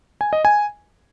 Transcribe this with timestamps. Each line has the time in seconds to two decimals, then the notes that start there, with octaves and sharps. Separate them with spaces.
0.21 G#5
0.33 D#5
0.45 G#5